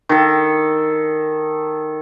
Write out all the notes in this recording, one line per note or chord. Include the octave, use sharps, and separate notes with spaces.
D#3 A4